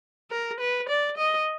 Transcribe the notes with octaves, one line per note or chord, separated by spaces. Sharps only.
A#4
B4
D5
D#5